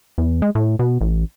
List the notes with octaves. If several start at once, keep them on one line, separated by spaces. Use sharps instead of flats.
E2
G#3
A2
B2
A1